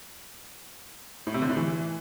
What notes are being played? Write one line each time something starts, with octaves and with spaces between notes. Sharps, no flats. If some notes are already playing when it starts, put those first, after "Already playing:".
A2
C3
D3
A2
E3